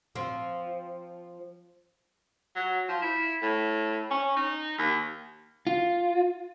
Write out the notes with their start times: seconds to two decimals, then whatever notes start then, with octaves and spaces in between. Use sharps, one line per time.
0.15 F3 C4
2.56 F#3
2.88 F3
3.02 E4
3.42 A2
4.10 C#4
4.36 D#4
4.78 D#2
5.67 F4